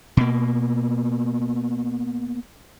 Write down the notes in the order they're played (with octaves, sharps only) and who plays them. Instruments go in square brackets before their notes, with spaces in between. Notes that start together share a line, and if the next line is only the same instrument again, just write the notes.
[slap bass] B2 A#3